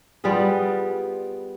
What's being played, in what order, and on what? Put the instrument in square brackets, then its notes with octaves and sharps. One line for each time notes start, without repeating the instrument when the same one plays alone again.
[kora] G3 B3 F4 G#4